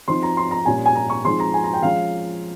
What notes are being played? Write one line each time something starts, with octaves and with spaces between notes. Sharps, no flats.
F3 C4 D#4 C6
A#5
C6
A#5
A#2 G3 A#3 C#4 F4 G#5
G#5
A#5
C#6
F3 G#3 C4 D#4 C6
A#5
G#5
A#5
G5
F3 G#3 C#4 F5